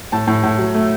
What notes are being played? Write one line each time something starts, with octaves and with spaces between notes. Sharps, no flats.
A2 A5
A2
A2
F#3
A3